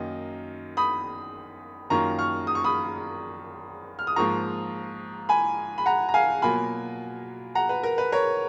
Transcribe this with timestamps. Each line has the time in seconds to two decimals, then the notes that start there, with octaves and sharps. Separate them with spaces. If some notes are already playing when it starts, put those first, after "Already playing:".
Already playing: F#2 D#3 A#3 D#4
0.77 B5 D#6
1.90 F#2 D#3 A#3 F4 A#5 C#6
2.19 C#6 F6
2.47 D#6
2.55 C#6
2.64 B5 D#6
3.99 F6
4.07 D#6
4.16 G#2 F3 A#3 F4 A#5 C#6
5.29 G#5 B5
5.78 B5
5.86 F#5 A#5
6.09 A#5
6.14 F5 G#5
6.42 B2 F#3 A#3 F4 G#5 B5
7.55 F#5 A#5
7.69 B4
7.83 A#4
7.98 B4
8.12 A#4 C#5